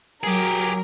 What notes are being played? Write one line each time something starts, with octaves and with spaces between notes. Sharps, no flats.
F#3 G4 G#4 A#4